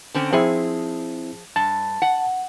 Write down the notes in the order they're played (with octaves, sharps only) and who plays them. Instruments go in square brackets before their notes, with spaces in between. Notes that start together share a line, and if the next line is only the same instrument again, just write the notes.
[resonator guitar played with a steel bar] D3 C4 C#4
[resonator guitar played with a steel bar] F3 G#4 [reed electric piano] C4 E4
[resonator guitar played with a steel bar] G2 [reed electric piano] A5
[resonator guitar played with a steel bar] F#5